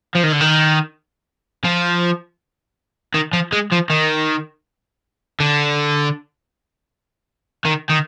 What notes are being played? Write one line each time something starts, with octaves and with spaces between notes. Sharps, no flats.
F3
D#3
D3
D#3
F3
D#3
F3
G#3
F3
D#3
D3
D#3
D#3